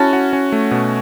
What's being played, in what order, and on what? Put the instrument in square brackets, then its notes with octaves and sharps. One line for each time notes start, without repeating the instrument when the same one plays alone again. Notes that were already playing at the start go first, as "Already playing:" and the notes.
Already playing: [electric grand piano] C#4 F#4 [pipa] E4 A4
[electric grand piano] F#4
C#4
A3
B2